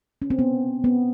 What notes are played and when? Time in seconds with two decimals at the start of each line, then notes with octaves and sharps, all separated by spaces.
0.22 C#4
0.30 C4
0.39 B3
0.84 B3